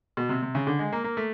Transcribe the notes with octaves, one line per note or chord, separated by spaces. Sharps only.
B2
C3
C3
C#3
D3
G#3
A#3
A#3
A3